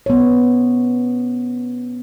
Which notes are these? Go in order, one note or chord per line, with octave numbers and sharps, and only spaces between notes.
B3 C#4 C#5